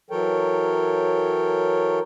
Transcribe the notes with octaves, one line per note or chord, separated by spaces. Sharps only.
E3 F#3 A4 A#4 C#5 G5